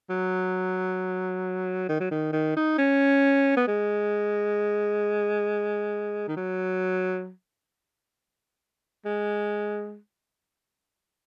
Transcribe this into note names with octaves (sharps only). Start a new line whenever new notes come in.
F#3
D#3
F#3
D#3
D#3
D#4
C#4
B3
G#3
D#3
F#3
G#3